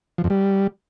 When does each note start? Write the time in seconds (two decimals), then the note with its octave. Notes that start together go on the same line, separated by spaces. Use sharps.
0.18 F3
0.24 F2
0.30 G3